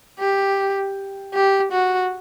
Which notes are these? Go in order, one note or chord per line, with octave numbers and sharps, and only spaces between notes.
G4
G4
F#4